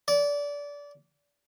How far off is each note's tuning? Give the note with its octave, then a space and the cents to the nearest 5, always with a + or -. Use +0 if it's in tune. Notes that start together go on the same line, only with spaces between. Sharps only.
D5 -25